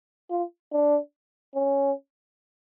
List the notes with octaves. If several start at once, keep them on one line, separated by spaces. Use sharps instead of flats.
F4
D4
C#4